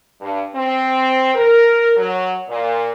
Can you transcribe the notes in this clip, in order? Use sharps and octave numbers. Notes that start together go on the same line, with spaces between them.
G2
C4
A#4
F#3
A#2